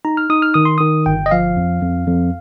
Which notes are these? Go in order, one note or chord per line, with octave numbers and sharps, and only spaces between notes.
D#4 A#5
F6
D#4 D#6
F6
D#3 D#6
C6
D#3 D#6
G1 G5
D#5
F3 F5
F2
F2
F2